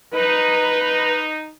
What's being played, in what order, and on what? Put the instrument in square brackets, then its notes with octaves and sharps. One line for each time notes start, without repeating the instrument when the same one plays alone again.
[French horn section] D#4 [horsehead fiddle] B4